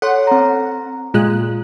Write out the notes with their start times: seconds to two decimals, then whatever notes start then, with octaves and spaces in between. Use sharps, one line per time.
0.02 A4 C#5 F#5 C6
0.27 C4 A#5
1.14 A#2 G#3 F4 F#6